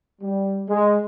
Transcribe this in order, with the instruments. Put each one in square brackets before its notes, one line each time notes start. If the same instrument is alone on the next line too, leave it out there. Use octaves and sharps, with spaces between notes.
[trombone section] G3
G#3